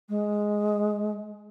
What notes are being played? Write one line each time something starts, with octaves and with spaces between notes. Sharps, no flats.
G#3